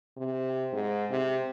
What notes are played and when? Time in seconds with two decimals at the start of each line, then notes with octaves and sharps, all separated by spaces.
0.17 C3
0.73 G#2
1.10 C3